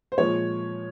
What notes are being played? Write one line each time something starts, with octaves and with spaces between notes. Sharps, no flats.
C5
A#2 F3 G#3 C#5